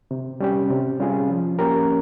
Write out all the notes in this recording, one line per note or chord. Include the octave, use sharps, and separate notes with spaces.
C3
G3 C#4 G4
C3
G3 C#4 F4 G#4
F3
A#3 C#4 G4 A#4